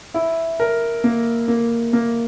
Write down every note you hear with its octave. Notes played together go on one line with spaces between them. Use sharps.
E4
A#4
A#3
A#3
A#3